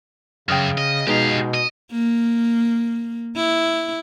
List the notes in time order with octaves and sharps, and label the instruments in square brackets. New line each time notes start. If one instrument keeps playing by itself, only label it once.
[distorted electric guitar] F#2 [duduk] C#3 [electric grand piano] G5 D#6 F6
[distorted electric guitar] D#5
[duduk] B2 [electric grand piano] G#3 B3 D#4 [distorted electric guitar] G4 F5
[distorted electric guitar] D#5
[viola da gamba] A#3
E4